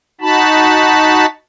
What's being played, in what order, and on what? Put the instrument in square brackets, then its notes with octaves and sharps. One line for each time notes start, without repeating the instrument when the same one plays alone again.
[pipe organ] D#4 F#4 A5 B5